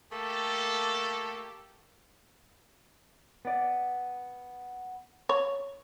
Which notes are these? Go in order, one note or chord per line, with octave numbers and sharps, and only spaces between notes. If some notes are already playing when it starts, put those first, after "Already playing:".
A3 A#3 G4 A4
B3 D5
C#5